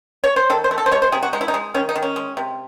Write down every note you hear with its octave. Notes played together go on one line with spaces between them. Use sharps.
C#5
C5
D#3 A4
C5
A3
A4
C5
G#3 C#5
C5
C3 G#4
F#4
G#3 D#4
E4
D#4
G#3
D#3 C#4
D#4
D#3
C#4
G#3
C3